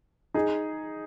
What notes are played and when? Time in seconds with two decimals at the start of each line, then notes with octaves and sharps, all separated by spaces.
0.34 D#4 G#4